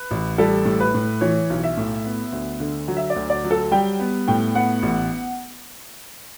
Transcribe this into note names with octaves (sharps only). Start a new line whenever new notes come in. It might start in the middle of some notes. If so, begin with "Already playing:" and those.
Already playing: B4
A1
G3 A4
A2
B4
A2
E3 C#5
B1
E5
A2
B3
D2
D3
F#3
E5
D5
D2
D5
F#3
A4
G3 G5
B3
A2 G5
B3 F#5
A1